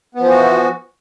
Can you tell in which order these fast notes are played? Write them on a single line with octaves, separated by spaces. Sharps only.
B3 F3 E3 F#4